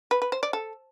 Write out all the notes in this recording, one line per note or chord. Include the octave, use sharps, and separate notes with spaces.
B4
B4
C5
D5
A4